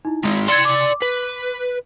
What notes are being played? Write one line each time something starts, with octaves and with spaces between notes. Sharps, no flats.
D#4 E4
D#3 G#3
D5 C6 G#6 C#7 E7
D6
B4